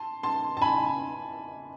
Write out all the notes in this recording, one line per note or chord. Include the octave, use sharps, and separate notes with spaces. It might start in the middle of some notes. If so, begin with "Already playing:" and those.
Already playing: A5 C6
A5 C6
A5
G#5 B5